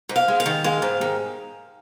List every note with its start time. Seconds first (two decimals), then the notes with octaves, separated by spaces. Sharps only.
0.09 G#2
0.16 F5
0.28 G#3
0.40 F5
0.46 D#3
0.64 G#3 F5
0.82 G#2
1.01 D#3